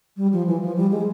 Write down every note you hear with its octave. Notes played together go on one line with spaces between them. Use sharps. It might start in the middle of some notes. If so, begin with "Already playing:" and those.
G3
F3
E3
F3
G3
G#3